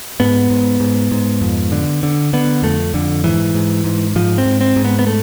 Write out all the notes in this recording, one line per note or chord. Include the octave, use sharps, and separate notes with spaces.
G#2 B3
G#2
G#2
G#2
F2
D3
D3
D3 B3
F2 A3
F2 D3
G#2 E3
G#2
G#2
G#2 F3
C4
G#2
C4
G#2
B3
B3
A3